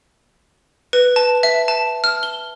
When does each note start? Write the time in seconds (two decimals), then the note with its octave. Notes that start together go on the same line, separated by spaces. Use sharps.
0.93 B4
1.16 A5
1.43 E5
1.68 A5
2.04 F6
2.23 G7